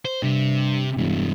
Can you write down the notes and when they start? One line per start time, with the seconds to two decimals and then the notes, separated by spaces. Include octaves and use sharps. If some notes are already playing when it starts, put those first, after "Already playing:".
0.05 C5
0.23 G2 C3
0.97 E1 C2 G2